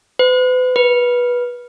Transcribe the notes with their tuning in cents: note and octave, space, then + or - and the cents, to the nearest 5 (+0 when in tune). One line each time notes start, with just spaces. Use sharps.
B4 +40
B4 -20